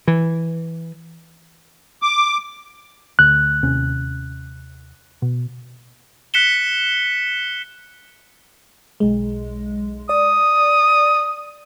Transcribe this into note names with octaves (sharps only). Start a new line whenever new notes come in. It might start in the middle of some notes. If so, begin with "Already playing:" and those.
E3
D6
D2 F#6
D#2 C3 C#4
B2
F#6 B6 C#7 E7 G7
B1 G#3
D5 D#6